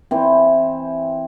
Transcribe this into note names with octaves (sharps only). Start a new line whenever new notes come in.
E3 C4